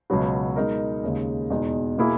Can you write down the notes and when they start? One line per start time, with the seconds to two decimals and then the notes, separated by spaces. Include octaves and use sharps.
0.10 C#2 B2 F#3 B3 F#4
0.56 B2 G#3 D#4 A#4
1.04 D#2 C#3 G#3 D#4
1.50 E2 B2 G#3 D#4
1.98 B2 A#3 E4 G#4